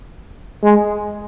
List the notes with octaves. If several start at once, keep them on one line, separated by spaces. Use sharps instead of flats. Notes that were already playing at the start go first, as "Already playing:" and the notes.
G#3